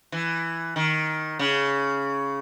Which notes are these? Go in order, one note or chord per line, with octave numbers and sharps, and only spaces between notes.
E3
D#3
C#3